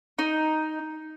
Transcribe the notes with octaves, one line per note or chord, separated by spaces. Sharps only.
D#4